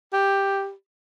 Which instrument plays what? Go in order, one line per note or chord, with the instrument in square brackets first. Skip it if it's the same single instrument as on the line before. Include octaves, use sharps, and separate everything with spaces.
[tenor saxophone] G4